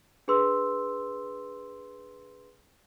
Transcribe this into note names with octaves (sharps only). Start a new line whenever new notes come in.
D4 G#4 B4 C6 E6